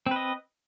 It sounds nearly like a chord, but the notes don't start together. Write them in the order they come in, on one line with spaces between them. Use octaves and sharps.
C4 B4 D#5